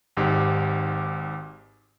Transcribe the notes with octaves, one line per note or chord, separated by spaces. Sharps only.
G#1 G#2 G4